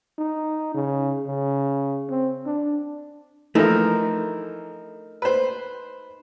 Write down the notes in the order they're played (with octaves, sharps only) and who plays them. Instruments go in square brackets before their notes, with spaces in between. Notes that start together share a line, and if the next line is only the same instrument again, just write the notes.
[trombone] D#4
C#3
C#3
C4
D4
[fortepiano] E3 F3 [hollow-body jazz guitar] A3 [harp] D#4 A#4
[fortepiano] B4 C5